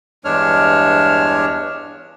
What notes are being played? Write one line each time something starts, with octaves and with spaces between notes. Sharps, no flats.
E2 G2 G#3 D4 C#5 F6